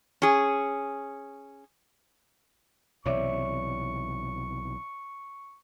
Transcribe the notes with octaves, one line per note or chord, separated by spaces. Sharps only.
C#4 G#4
B1 C3 E3 C#5 D5 E5 C#6